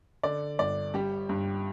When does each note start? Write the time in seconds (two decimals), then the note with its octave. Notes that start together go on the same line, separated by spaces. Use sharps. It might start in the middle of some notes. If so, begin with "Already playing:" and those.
0.23 D3 D5
0.59 G1 D5
0.94 G3 G4
1.29 G2